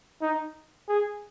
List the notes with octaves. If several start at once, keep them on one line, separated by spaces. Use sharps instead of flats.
D#4
G#4